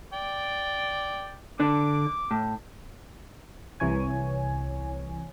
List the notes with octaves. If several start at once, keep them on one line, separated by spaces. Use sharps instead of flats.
D5 G5
D3 D4 D6
A2
C2 C3 E3 C#5 G#5